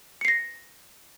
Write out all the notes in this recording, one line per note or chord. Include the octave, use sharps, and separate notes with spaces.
A#6 C7 C#7